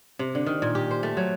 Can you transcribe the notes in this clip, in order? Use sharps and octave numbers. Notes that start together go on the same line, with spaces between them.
C3
D3
D#3
A#2
G4
C5
A3
F#3